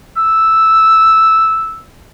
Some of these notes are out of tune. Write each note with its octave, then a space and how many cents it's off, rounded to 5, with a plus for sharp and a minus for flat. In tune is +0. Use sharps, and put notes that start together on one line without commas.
E6 -5